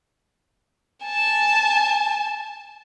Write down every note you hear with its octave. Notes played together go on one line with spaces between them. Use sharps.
G#5 A5